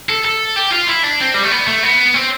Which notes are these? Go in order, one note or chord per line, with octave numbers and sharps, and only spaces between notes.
A4
A4
G4
F4
E4
D4
C4
G3
A3
B3
A3
B3
C4